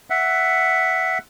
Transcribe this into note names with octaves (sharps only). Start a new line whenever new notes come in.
E5 F#5